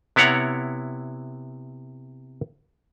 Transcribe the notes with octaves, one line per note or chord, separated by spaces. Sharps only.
C3 B3 E4 C#5 F#5 A#5